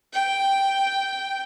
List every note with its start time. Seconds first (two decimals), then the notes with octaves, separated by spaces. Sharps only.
0.13 G5